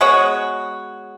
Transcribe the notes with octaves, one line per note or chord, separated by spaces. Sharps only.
G#3 B3 F#4 C#5